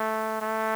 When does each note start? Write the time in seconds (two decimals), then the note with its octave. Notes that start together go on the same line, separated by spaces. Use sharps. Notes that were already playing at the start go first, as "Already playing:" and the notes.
Already playing: A3
0.42 A3